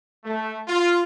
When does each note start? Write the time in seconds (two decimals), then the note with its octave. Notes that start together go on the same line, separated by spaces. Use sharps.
0.24 A3
0.68 F4